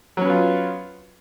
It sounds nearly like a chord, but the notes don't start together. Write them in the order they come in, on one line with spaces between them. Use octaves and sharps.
F#3 C#4 B3 F4